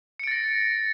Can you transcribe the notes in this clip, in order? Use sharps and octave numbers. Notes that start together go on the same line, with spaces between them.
A6 A#6 C#7 D7